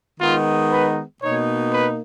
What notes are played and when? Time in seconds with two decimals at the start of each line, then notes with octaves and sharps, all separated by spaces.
0.20 D#3 G#3 B3 D#4 F4
0.71 B4
1.21 B2 A#3 D#4 C#5
1.72 B4